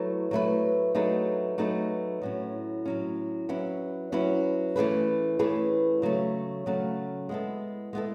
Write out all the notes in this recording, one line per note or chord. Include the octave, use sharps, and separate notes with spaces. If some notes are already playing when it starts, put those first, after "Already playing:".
Already playing: F#3 A3 E4 B4
F#3 A3 E4 B4
F#3 A3 D#4 G#4 B4
F#3 A3 D#4 G#4 B4
A2 F#3 C#4
A2 F#3 C#4
F#3 C#4 E4 B4
F#3 C#4 E4 B4
E3 A3 C#4 G#4 B4
E3 A3 C#4 G#4 B4
C#3 F#3 A3 C#4
C#3 F#3 A3 C#4
G#3 B3 E4 A4
G#3 B3 E4 A4